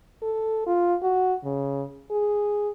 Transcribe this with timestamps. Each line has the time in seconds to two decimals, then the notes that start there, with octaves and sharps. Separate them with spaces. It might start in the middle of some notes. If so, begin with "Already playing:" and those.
0.22 A4
0.66 F4
1.03 F#4
1.44 C#3
2.10 G#4